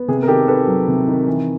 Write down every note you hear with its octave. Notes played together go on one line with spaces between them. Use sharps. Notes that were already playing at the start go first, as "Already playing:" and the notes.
Already playing: B3
C3 G#4
A#4
D#3 G4 A4
D#3 A4 B4
F#3
C3
D#3
E3